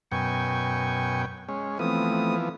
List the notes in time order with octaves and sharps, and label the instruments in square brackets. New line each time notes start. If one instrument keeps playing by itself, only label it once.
[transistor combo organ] F#2 B2 G5 [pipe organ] G#5 C#6
[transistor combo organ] G#3 C#4
[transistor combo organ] E3 F3 B3 [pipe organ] A3 C4 D#6